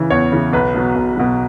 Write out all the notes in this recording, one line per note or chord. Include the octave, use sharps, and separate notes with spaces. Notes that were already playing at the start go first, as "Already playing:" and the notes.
Already playing: C#3 E3
E2 C#5
C#3 E3
B1 B4
B2 F#3
B1
B2 F#3